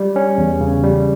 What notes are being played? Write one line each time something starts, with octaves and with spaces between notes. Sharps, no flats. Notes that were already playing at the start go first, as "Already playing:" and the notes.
Already playing: G3
C#4
E2
C#3
G3